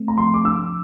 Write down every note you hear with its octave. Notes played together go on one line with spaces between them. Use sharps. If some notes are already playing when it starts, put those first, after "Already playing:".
Already playing: A3 C4
A#5
F3 C6
D6
D4 E6